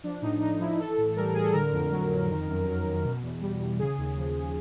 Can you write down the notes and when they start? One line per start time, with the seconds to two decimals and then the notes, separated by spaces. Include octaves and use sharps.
0.04 F3 D4
0.22 A2 D#4
0.41 A2 D#4
0.60 F3 E4
0.79 E3 A4
0.98 A2
1.16 G3 A#4
1.34 A2 G#4
1.43 A4
1.53 D3 A#4
1.73 F2
1.91 F#3
2.10 F2
2.29 D#3
2.47 F#2
2.67 F#3
2.85 F#2
3.04 B2
3.23 E2
3.41 G3
3.61 E2
3.79 C#3 G#4
3.98 D#2
4.17 F3